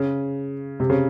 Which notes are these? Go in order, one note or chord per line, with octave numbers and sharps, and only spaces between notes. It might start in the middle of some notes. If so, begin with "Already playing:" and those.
Already playing: C#3
C3
C#3